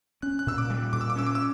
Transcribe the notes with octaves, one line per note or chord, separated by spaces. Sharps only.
C#4 F#6
F#6
A#2 E6
D6
G3
A#2 D6
E6
D6
C#4 E6
D6
E6